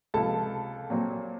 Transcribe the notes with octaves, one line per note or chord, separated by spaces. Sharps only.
C#2 C3 F3 A4 A5
A#2 F#3 C4